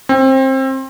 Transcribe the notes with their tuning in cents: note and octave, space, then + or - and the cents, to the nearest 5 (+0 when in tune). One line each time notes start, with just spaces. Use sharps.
C4 +25